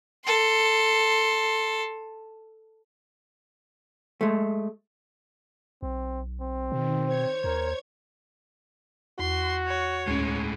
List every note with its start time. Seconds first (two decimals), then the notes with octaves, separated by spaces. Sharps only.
0.25 A4 C6
4.21 G#3 A3
5.82 B1 C4
6.41 C4
6.72 B2 D#3
7.07 C5 C#5 G#6
7.44 D#2 A#4
9.19 E2 F#4 C6
9.67 C#5
10.07 D2 A2 G#3 C#4